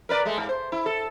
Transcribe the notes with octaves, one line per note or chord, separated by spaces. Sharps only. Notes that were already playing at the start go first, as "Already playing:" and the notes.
A#4 B4 D5
G#3 A3
G#2
C5
E4
A4